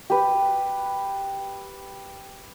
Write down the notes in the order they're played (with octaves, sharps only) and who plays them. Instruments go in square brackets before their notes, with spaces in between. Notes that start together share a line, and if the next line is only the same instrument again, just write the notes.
[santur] G4 B4